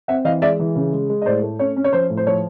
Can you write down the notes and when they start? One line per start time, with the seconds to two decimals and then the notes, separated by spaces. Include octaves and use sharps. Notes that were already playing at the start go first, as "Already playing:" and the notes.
0.08 C4 E5 F#5
0.25 E3 D#5 F5
0.42 G#3 D5 E5
0.59 E3
0.76 C#3
0.93 G#3
1.09 G#3
1.22 D#5
1.26 A2 C5 D5
1.43 A3
1.59 C#4 C#5
1.76 C#4
1.84 C#5
1.93 F3 C5
2.10 A2
2.17 C5
2.26 F3 C#5